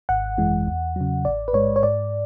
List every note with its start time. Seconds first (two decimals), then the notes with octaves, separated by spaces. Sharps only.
0.09 G#1 F#5
0.38 F#2 E3 G#3
0.67 E2
0.96 C#3 F#3
1.25 A1 D5
1.48 B4
1.53 G#2 G#3 C#5
1.76 C#5
1.83 G#2 D5